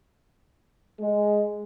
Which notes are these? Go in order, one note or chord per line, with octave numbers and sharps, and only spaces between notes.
G#3